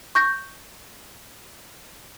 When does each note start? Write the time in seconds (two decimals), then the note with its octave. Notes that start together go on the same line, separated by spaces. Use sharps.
0.15 C#6 G6 A#6